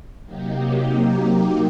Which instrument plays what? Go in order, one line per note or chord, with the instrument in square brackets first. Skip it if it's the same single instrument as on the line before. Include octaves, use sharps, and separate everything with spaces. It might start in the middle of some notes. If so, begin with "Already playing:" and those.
[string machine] C3 F#3 A#3 D#4 G4